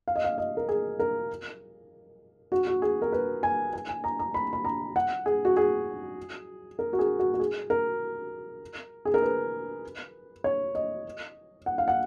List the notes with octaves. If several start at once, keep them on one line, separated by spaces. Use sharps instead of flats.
F5
D#5
F5
D#5
A#4
G#4
A#4
F#4
F#4
G#4
A#4
B4
G#5
G#5
G#5
A#5
A#5
B5
B5
A#5
F#5
G#4
F#4
G#4
A#4
F#4
G#4
F#4
F#4
G#4
A#4
G#4
A#4
B4
C#5
D#5
F#5
F5
F#5